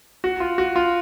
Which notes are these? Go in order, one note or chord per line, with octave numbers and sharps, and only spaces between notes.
F#4
F4
F#4
F4